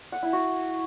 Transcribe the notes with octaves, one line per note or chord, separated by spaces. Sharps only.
F#5
E4
F#4